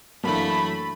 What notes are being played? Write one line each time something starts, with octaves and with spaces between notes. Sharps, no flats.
F#2 E3 A3 A#3 D4 B5